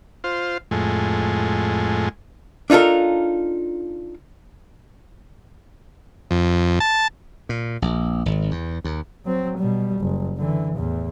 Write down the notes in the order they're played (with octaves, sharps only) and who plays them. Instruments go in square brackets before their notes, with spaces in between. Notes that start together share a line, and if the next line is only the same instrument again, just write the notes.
[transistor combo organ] F4 C5
F2 A2 G#3
[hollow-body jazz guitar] D4 D#4 F4 A4 A#4
[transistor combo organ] F2
A5
[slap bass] A#2
A#1
G#1
E2
D#2
[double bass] F#3 C4
B2 G3
F#1
D3 E3
E2 A2